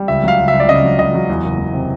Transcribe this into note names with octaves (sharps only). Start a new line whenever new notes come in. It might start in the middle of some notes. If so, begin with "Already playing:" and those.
Already playing: G3
C#2 E5
F#3 F5
C#2
E5
C#2
D5
C#3 D#5
F#3
C#2 D#5
F#3
E2
F#1
E2
C3